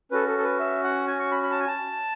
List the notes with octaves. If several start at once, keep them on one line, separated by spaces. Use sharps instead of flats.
C#4 F#4 A4 B4
A4
A4
B4
E5
F#5
G#5
C#6
B5
B5
A5
G#5
A5